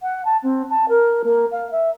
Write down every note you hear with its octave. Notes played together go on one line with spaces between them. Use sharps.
F#5
A5
C4
A5
A#4
A#3
F5
E5